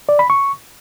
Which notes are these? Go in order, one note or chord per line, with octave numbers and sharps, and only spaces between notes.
D5
B5
C#6